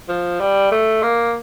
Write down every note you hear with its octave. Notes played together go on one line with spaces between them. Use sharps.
F3
G3
A3
A#3